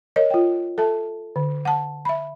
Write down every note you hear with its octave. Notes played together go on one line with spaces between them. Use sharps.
A#4 C#5 D#5
F4 G5
A4 E5 A5
D3
F#5 A5
E5 B5